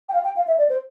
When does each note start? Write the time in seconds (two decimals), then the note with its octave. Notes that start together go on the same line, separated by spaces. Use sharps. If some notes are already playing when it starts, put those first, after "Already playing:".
0.09 G5
0.13 F5
0.24 G5
0.36 F5
0.47 E5
0.58 D5
0.69 C5